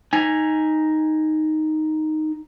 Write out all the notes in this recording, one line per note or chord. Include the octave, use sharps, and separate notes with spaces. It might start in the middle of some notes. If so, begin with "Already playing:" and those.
D#4 G#5